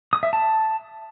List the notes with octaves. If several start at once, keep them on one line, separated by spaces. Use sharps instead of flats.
D#6
E5
A5